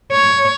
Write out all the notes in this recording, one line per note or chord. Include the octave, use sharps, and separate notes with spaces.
C#5